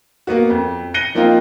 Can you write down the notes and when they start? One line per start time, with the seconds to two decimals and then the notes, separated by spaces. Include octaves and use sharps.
0.27 A#3 B3 F#4
0.50 F2
0.94 F#6 A#6 C#7 D#7 G7
1.15 F3 A#3 C4 D#4 F4